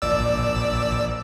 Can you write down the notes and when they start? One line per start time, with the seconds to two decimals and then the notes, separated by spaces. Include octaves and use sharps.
0.02 A#1 D5 E6